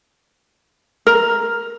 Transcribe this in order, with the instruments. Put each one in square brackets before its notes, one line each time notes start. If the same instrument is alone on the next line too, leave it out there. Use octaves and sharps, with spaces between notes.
[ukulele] A#4